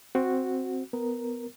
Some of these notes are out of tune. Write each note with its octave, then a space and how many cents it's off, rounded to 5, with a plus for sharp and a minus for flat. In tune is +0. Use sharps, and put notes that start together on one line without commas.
C4 +0 F#4 -5
B3 +15 A#4 +0